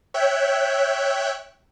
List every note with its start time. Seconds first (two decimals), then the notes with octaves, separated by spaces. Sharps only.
0.14 C#5 E5 G5 F#6